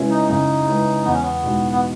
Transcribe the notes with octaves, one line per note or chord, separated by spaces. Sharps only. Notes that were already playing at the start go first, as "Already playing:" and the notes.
Already playing: C#3 G#3 C#4 E4 B4
D#4
C#3 D#4
G#3 C#4 E4 B4
E2 B3
C#4
B3
B2 G#3 D#4
B3